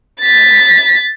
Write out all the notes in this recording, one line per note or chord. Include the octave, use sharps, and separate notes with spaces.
A6 B6